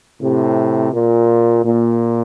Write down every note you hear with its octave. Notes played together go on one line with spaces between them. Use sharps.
A2 C3
A#2
A#2